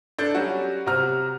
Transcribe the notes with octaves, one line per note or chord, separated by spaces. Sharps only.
D4 A4 G6
F#3 G3 C#4 F#4
C3 F#4 A#5 F6